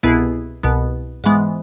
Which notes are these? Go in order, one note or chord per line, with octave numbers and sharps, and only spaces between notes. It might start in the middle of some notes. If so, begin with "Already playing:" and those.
C2 B2 B3 E4 G#4
C2 B2 B3
G#2 E3 G#3 B3